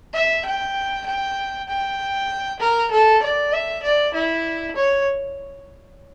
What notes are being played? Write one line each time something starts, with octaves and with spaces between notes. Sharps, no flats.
E5
G5
G5
G5
A#4
A4
D5
E5
D5
E4
C#5